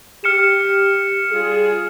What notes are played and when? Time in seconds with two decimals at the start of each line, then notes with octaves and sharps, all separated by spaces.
0.24 G4 F6 C#7 E7
1.31 G3 F4 G#4